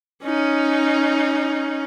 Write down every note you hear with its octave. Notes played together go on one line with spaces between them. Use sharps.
C#4 D#4